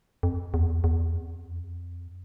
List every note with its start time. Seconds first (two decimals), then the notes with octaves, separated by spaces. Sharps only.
0.23 F2
0.54 E2
0.84 E2
1.14 F2